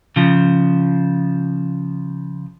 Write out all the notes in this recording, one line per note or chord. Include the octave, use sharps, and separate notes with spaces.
C#3 F3